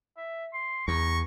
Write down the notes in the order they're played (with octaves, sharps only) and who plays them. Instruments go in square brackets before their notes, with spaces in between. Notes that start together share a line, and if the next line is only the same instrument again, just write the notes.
[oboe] E5
C6
[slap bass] E2 [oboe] A#5 [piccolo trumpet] C#6